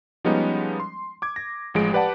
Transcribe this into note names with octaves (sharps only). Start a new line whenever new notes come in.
F3 G3 G#3 B3 C#4 D#4
C6
D6 G#6
A#6
A1 F3 G#3 D7
G4 B4 D5 F#5 A5